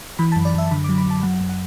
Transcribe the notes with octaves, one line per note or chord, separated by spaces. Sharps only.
E3 B5
F#2 A5
D5
F#2 E5
D3 B5
F#3 D6
B5
F#2 A5
F#3 F#5
F#2
F#5